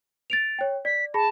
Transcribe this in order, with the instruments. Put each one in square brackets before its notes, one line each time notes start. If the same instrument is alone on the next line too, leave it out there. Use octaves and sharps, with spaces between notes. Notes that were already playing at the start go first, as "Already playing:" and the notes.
[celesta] A6 D7 F7
C#5 G5
[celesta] D5 [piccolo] B6
[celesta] G#4 B5 A#6 [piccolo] A5